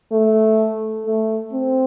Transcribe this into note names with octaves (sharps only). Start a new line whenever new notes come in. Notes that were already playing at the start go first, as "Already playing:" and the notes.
A3
A3
C4